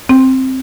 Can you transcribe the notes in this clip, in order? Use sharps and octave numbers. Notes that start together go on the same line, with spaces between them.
C4